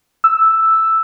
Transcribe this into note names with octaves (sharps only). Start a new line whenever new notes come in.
E6